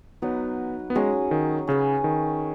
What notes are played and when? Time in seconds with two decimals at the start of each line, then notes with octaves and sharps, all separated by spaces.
0.22 F#3 B3 D#4 B4 D#5
0.90 B3
0.95 F#3 G#3 C#4 G#4
1.31 D#3
1.67 C#3 C#4 G#4 B4
2.04 D#3